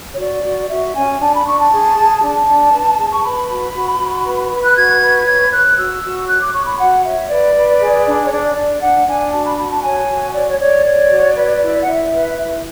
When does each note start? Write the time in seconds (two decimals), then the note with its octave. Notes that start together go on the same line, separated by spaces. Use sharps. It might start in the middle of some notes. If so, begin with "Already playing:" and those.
0.14 C#5
0.18 F#4 D5
0.44 F#4
0.70 F#4 E5
0.94 C#4 G#5
1.21 D4 A5
1.34 B5
1.45 D4 C#6
1.59 A5
1.71 G#4
1.97 G#4
2.22 D4 A5
2.47 D4
2.73 B4
2.98 G#4
3.12 C#6
3.23 B4 B5
3.49 F#4
3.74 F#4
4.00 F#4
4.25 B4
4.51 B4
4.65 F#6
4.75 F#4 G#6
5.01 B4
5.26 C#5 G#6
5.51 C#5 F#6
5.77 F#4 E6
6.03 F#4
6.19 E6
6.27 C#5 F#6
6.40 D6
6.53 C#5 C#6
6.66 B5
6.79 F#4 F#5
7.04 C#5 E5
7.29 B4 D5
7.55 B4
7.80 G#4
8.06 D4
8.26 C#5
8.31 D4 D5
8.56 D4 D5
8.81 D4 F#5
9.07 D4 G#5
9.32 F#4 A5
9.45 B5
9.59 F#4 B5
9.71 A5
9.83 C#5 G#5
10.09 F#4
10.34 C#5 D5
10.47 C#5
10.60 C#5 D5
10.86 C#5
11.10 F#4
11.36 B4
11.61 E4
11.82 F#5
11.86 E4 E5
12.13 B4
12.37 E4 E5